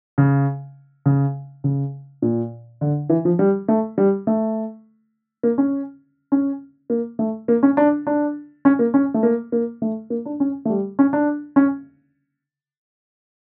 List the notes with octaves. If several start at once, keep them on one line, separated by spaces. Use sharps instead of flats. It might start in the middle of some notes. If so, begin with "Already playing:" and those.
C#3
C#3
C#3
A#2
D3
E3
F3
G3
A3
G3
A3
A#3
C#4
C#4
A#3
A3
A#3
C#4
D4
D4
C#4
A#3
C#4
A3
A#3
A#3
A3
A#3
D4
C#4
A3
G3
C#4
D4
C#4